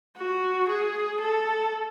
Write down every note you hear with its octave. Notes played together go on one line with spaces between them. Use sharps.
F#4
G#4
A4